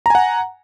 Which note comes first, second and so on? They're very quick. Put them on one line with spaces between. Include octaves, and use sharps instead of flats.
A#5 G#5 F#5